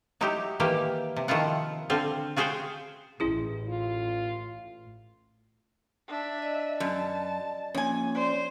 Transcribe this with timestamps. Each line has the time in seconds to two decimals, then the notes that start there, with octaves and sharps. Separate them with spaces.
0.21 F#3 D#4 E4 F#4 G4
0.60 D#3 E3 A#3 G4
1.16 C3
1.28 D#3 F3 E4 F4 F#5
1.90 D3 C4 F4
2.36 F4 F#4 G#4 C5 F5 G5
3.20 A1 C#4 E4 G#4
3.69 F4
6.08 D4 E5
6.38 D5 D#5
6.80 F#2 A5
7.74 F2 A#3 C#4 G#5
8.15 C5 D5